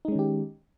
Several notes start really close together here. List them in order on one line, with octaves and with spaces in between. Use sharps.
D#4 G#3 C#4 D#3 G4